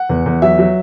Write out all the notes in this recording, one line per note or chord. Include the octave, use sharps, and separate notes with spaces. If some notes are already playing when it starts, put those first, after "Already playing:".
Already playing: F#5
E2
E2
F#3 E5
F#3